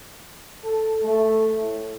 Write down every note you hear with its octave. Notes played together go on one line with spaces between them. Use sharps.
A4
A3
A2